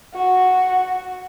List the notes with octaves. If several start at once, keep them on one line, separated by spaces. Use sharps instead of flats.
F#4